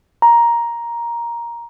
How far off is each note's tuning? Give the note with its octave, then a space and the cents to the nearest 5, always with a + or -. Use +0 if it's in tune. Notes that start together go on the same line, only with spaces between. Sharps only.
A#5 +10